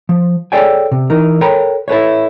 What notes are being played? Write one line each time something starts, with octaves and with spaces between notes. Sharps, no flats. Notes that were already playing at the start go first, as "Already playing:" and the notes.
F3
G#4 A4 C#5 D5 G5 G#5
C3
E3 D#4 A#4
A4 A#4 C#5 G5 A#5 B5
E4 A4 B4 C#5